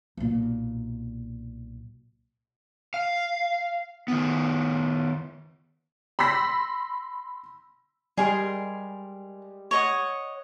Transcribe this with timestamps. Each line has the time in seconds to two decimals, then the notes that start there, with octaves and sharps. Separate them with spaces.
0.17 B1 A#2
2.94 F5
4.08 D#3 B3
6.19 B5 C6 E6 A#6 B6
8.17 G3 G#3 G#4 A#4 C6
9.71 C#5 D#5 F#5